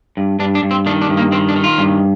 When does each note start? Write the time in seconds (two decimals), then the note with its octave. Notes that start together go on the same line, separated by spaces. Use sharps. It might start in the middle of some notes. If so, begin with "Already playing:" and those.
0.17 G2
0.39 G2 D4
0.55 D4
0.63 G2
0.71 C4
0.86 D#3 D4
1.02 D4
1.09 G2
1.17 A#3
1.32 D#3 C4
1.49 D4
1.56 D#3
1.64 F4
1.78 G2